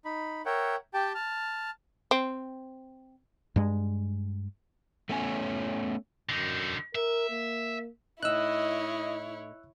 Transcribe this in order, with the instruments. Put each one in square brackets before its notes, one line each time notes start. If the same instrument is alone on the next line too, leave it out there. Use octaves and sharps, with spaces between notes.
[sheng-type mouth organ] D#4 B5
A#4 C#5 E5 F#5 G5
G4 G5 A5
A5 F6
[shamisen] C4
[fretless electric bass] G2 G#3
[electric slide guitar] A3 B3 C#4 C#5 G#5
[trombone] F#2 [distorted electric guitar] D3 D#4
[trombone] A#4 [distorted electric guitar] E5
[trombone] A#3
[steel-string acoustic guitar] A2 D#4 [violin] E4 C#5 [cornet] D#5 [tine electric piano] E6 F#6